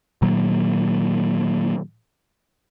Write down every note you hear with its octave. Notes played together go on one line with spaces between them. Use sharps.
A#2 D#3 F#3 A#3